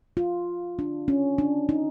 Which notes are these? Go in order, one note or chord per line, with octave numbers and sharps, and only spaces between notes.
F4
D4
C#4
D4
D#4